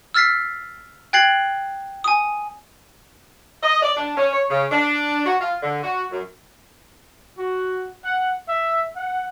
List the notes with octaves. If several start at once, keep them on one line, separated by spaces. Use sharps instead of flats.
E6 F6 A6 B6 C7
G5 F#6 G#6 A6 C7 F#7
G#5 D#6
D#5
D5
D4
C#4
C#5
C#3
D4
F#4
F4
D3
F#4
F#2
F#4
F#5
E5
F#5